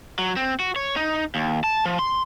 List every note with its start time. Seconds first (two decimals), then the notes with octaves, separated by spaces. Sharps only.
0.19 F#3
0.36 C4
0.60 F#4
0.76 C#5
0.96 D#4
1.35 D#2
1.64 A5
1.86 F3
1.99 C6